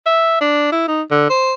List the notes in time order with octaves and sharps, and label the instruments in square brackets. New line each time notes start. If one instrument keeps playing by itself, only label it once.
[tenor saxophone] E5
D4
E4
D#4
D3
C5